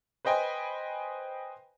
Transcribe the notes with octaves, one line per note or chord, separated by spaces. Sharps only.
B4 C5 D#5 G5 G#5 B5